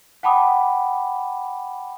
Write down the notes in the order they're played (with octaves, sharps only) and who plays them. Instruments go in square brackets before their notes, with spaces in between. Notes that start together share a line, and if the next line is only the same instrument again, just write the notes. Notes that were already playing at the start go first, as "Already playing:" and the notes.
[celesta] F#5 G5 A5 B5 D6 D#6